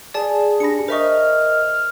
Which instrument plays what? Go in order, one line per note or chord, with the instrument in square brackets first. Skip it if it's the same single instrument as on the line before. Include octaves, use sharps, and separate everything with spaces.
[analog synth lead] G#4 [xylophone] D5 A5
[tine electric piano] D4 G4 B5 [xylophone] A#6 C#7
[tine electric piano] A#4 D#5 [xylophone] C5 E5 C#6 [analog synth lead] F6